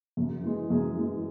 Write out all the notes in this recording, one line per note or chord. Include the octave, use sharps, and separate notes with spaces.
F#2
E3 G#3
F#2 G#4
E3 G#3